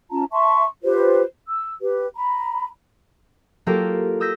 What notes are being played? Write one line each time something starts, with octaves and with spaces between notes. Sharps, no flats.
C#4 F4 A5 A#5
E5 A5 C6 C#6
F4 G4 B4 C5
E6
G4 B4
A#5 B5
F#3 A#3 F4 G4 A4 A#4
D#6 E6 G6 A#6 B6